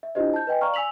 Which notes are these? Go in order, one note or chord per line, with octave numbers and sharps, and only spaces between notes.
E5
D4 E4 F4 G4 C5 D#5
A5 G6
B4 D#5 G5 G#5
D5 F5 A#5 C#6 F6
G#5 E6 B6 F7 F#7